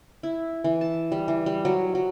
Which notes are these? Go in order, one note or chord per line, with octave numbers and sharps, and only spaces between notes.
E4
E3
A5
G3
E3
G3
F#3
F#3